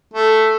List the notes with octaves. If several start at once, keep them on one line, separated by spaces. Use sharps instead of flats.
A3